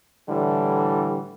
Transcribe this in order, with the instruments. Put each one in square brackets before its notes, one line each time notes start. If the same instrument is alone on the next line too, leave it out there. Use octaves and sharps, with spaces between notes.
[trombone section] A2 D3 E3 G3